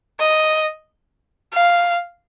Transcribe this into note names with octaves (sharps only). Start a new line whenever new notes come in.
D#5
F5